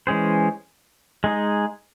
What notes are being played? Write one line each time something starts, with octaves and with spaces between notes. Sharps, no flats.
E3 G#3 C#4 G#4 C5
G#3 D#4 G#4